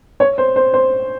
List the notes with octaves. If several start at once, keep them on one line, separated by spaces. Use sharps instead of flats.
C#5
C5
C5
C5